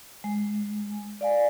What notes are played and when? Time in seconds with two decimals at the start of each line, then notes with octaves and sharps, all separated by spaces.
0.24 G#3
1.21 D5 F5 G#5